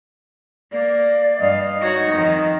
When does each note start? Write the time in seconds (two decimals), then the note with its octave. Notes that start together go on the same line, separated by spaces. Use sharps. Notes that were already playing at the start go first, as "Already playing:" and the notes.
0.72 A#3 D5
1.39 G2 D#5 F5
1.81 D#4 F#4 C#5 D#5
2.13 F2 D#3